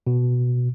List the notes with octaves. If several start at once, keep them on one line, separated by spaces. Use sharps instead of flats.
B2